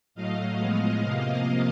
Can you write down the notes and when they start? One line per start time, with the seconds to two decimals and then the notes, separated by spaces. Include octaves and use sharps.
0.15 A2 F#3 A3 D#5 F5
0.58 A2 F3 G#3 B3
1.02 C3 F3 A#3 D#5 F5